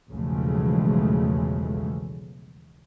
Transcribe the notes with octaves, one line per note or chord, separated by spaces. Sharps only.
B1 E2 C#3 F3 G#3 A3